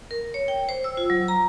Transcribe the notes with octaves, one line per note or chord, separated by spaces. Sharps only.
A#4
C#5
G5
C5
E6
F4
F#3
A#5